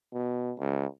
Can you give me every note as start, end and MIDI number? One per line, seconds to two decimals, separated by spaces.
0.13 0.53 47
0.59 0.86 37